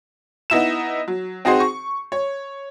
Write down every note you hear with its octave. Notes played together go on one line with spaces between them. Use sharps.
B3 D#4 E4 E7
F#3
C4 D#4 F#4 G#4 C5
C#6
C#5